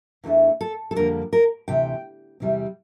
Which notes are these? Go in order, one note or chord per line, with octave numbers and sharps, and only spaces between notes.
E2 E3 A3 D4
A4
A4
F2 D3 G3 A#3 D4 A#4
A#4
D2 C3 E3 G5
E2 C3 E3 G3 C4